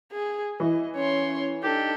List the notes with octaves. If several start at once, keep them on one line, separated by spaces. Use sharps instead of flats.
G#4
E3 D#5
C#4 C#5 C6
D4 D#4 G4 A4